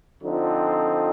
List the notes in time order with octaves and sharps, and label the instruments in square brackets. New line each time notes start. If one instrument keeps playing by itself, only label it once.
[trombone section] D3 F3 C4 D#4